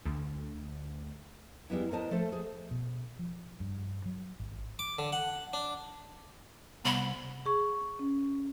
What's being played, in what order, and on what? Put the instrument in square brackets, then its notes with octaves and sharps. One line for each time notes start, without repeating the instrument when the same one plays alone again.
[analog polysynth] D2
[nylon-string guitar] G3 G#3 B3 E4
G#2 B3 A#4 C5 D#5 A5
F3 A3 A4 C5
G#4 C5
[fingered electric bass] B2
F3
G2
F#3
G#1
[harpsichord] D6
D3
F#5
D4
[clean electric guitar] C2 [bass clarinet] B3 [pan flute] B5
[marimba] G#4 C#6
C#4